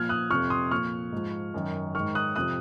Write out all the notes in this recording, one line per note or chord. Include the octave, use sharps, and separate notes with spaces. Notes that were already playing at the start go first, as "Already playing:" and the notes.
Already playing: A#2 F3 F6 G#6
D#6 F#6
F2 C3 F3 C#6 F6
C6 D#6
A#2 F3 C#6 F6
G#2 F3
F#2 D#3
G#2 D#3 C#6 F6
D#6 F#6
F2 C3 F3 D#6 F#6